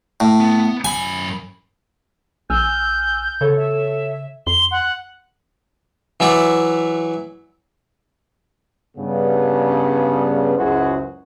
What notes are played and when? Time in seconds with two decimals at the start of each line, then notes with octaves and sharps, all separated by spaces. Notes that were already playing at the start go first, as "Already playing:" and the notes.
0.20 A2
0.40 B3
0.85 F#2 G#5 B5
2.50 A#1 G#5 E6 F6 G6
3.41 C#3 A4 C#5
3.57 E5
4.47 F2 C6 G7
4.71 F#5
6.20 E3 F#3 E4 D5
8.97 G2 C#3 B3
10.57 C#2 F#2 E4 F#4 G#4 C5